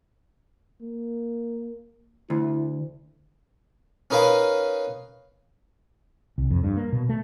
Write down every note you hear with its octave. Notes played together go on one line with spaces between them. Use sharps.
A#3
D2 E4
C#4 D#4 A#4 B4 F5
C2
F2
G2
A#3
B2
A3